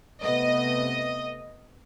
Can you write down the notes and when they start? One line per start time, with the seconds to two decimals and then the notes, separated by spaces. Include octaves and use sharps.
0.22 C3 A3 B3 D#5